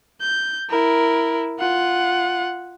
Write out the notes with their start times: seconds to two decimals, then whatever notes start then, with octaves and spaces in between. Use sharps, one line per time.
0.21 G6
0.70 E4 A#4
1.59 F4 F#5